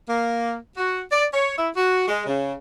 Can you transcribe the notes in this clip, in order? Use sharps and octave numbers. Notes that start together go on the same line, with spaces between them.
A#3
F#4
D5
C#5
E4
F#4
G#3
C#3